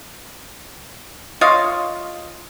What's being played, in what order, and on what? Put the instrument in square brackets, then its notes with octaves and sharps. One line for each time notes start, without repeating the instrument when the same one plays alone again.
[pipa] F4 C#5 D#5 F5